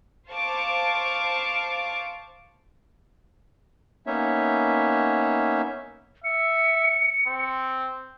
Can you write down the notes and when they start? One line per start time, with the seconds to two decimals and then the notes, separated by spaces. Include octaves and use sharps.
0.30 C5 F5 A5 C#6 D6
4.07 A#3 B3 C#4 D#4 C#5 E5
6.25 E5 C#7
7.27 C4